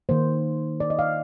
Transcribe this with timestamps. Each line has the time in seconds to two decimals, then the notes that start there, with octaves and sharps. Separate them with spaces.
0.09 D#3 A#3 C5
0.80 D5
0.90 D#5
0.99 F5